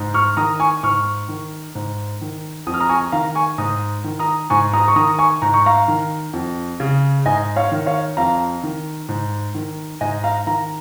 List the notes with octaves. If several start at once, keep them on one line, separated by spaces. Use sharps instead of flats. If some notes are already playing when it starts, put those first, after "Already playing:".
Already playing: G#2
C#6 F6
D#3 A#5 D#6
G#5 C#6
G#2 C#6 F6
D#3
G#2
D#3
F2 D#6
F6
A#5 D#6
G#5 C#6
D#3 F5 A#5
G#5 C#6
G#2 A#5 D#6
D#3
A#5 D#6
G#2 G#5 C#6
A#5 D#6
C#6
D#3 A#5 D#6
G#5 C#6
G#2 A#5
C#6
F5 A#5
D#3
F2
C#3
G#2 D#5 G#5
C#5 F5
D#3
C#5 F5
F2 F5 A#5
D#3
G#2
D#3
G#2 D#5 G#5
F5 A#5
D#3 F5 A#5